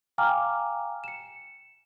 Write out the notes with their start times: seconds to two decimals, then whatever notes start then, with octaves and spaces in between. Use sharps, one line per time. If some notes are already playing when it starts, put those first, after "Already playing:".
0.18 F5 G5 G#5 A#5 D6 F6
1.04 C#7 E7